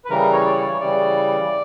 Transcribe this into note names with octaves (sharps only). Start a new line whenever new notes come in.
B4
C#3 E3 G3 A#4
C#5
D5
C#5
C#3 E3 G3 D5